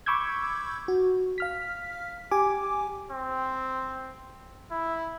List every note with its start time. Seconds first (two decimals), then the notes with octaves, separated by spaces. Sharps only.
0.06 B5 C#6 D6 E6 G6 G#6
0.88 F#4
1.38 F5 F6 B6
2.31 G4 G#5 D6
3.11 C4
4.71 E4